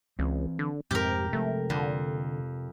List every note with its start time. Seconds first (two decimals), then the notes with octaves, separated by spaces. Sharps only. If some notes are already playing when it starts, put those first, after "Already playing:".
0.19 C#2 E3 C4
0.59 D3
0.91 F2 G#2 C3 G4 A#4
1.33 C3 F3 G#3 A3
1.70 F2 D3